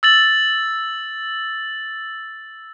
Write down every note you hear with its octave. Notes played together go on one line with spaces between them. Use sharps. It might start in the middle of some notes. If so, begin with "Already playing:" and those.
E6 A6 F#7